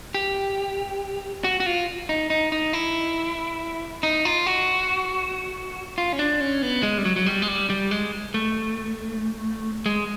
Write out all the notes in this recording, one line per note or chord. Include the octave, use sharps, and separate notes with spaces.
G4
F#4
F#4
F4
D#4
D#4
D#4
E4
D#4
F4
F#4
F4
C#4
D4
C#4
B3
G#3
G3
F#3
F#3
G3
G#3
G3
G3
G#3
A3
G#3